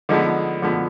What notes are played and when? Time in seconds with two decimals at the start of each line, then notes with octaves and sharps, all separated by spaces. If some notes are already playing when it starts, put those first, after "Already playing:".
0.09 D3 F3 G#3 B3 D#4
0.62 D3 F3 G#3 B3